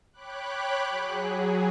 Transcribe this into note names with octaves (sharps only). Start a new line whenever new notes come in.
C#5 G5 B5 D6 F#6
F#3 G#4